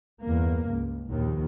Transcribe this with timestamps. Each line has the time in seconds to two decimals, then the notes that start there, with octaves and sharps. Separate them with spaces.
0.23 E2 G2 A#3
0.68 C#2
1.10 A#1 D#2 D#3